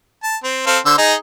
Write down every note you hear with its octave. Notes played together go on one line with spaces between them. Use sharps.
A5
C4
C4 A4 F5
D3 C5 E6
D#4 G#4 D#5